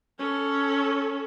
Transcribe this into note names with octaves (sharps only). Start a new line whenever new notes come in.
C#4 A4